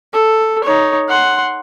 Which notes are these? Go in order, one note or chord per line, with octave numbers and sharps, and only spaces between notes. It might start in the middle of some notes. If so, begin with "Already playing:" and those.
A4
D#4 C#5
F#5 C6